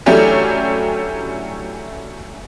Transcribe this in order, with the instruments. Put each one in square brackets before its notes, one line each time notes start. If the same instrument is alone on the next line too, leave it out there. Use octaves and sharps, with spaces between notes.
[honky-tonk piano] E3 F#3 A3 C#4 D4 G4